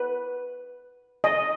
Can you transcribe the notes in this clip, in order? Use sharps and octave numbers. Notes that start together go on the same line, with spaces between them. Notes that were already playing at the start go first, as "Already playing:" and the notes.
Already playing: B4
D#5